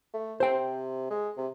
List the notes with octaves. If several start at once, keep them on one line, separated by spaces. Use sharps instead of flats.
A3
C3 C5 G5
G#3
C3